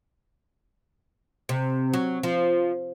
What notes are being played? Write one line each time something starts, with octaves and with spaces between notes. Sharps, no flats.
C3
F#3
F3